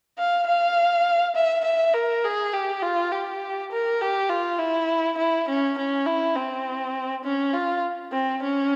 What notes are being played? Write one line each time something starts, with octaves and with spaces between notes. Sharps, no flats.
F5
F5
E5
E5
A#4
G#4
G4
F4
G4
A#4
G4
F4
E4
E4
C#4
C#4
E4
C4
C#4
F4
C4
C#4